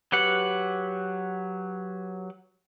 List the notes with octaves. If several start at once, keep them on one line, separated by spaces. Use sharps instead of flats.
F#3 G4 B4 F#5